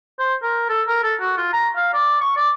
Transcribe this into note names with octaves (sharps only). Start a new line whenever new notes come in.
C5
A#4
A4
A#4
A4
F#4
F4
A#5
F5
D5
C#6
D5